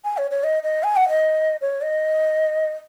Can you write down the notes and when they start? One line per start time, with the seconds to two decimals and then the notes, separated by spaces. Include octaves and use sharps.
0.05 G#5
0.18 C#5
0.31 C#5
0.44 D#5
0.63 D#5
0.83 G#5
0.96 F#5
1.09 D#5
1.62 C#5
1.82 D#5